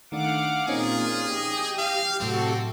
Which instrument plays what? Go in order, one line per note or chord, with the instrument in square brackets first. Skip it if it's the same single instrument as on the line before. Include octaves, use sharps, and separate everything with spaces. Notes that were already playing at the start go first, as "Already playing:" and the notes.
[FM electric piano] D#3 A3 D4 [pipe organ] F5 F#5 D6
[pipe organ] A#2 F4 [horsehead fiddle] A#3 [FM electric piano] C4 C#4 D#4 [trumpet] G#4
[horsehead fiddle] G4 [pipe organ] D#5
[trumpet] F5 [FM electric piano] G5
[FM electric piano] A2 F#3 [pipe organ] C3 F#4 A4 [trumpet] C4